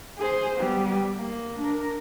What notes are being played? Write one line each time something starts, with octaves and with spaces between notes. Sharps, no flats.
G#4 C5
G3 B3
A#3
D4 A#4